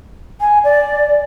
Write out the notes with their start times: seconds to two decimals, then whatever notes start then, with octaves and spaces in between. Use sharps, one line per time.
0.41 G#5
0.64 D5